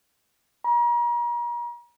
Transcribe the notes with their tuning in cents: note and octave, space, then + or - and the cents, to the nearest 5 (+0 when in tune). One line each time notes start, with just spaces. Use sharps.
A#5 +40